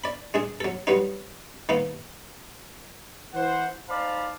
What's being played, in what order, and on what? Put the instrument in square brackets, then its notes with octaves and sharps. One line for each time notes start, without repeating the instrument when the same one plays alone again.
[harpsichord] D5 B5
G#3 D4 G#4
F#3 A4
F#3 G3 B3 D#4
D#3 A#3 B3
[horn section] E3 C5 F#5
D#4 C5 D5 F5 A5 B5